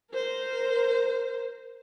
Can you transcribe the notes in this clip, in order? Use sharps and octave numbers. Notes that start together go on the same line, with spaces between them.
A#4 C5